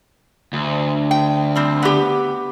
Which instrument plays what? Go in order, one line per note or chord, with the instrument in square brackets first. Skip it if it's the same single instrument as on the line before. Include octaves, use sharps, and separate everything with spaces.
[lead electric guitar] D2
[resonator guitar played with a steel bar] G5
G3 C4
B3 G4